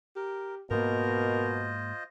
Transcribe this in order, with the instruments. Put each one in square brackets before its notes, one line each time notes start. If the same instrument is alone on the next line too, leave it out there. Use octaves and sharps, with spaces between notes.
[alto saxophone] G4 [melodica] A#4
[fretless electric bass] G#2 A#3 [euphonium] B2 [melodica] F4 C5 D#5 [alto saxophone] A#4